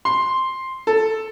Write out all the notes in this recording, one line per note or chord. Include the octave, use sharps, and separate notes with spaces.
C6
A4